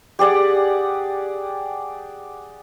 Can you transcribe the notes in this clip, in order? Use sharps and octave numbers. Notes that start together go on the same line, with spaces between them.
G4 G#4 D5 F#5